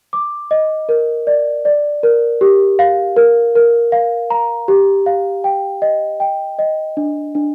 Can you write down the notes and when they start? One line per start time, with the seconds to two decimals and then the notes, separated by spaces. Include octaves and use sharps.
0.13 D6
0.51 D#5
0.89 A#4
1.27 D5
1.65 D5
2.03 A#4
2.41 G4
2.79 F5
3.16 A#4
3.55 A#4
3.92 F5
4.30 A#5
4.68 G4
5.06 F5
5.44 G5
5.82 D#5
6.20 G5
6.59 D#5
6.97 D4
7.35 D4